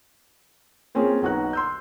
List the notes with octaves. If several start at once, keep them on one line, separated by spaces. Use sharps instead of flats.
A#3 C4 C#4 F4 G#4
B1 D#4 F#4 B4 A#5 F#6
C6 E6 G6